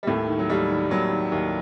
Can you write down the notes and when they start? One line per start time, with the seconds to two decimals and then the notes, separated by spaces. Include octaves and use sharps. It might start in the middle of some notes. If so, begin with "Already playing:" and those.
0.03 G3
0.07 D#2 A2 A3
0.28 D#3
0.39 F#3
0.49 D#2 G3
0.70 D#3
0.90 D#2 F#3
1.11 D#3
1.32 D#2